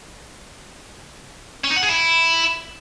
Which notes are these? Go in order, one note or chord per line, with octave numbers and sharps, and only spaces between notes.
C#4
D#4
F#5
G#4
E4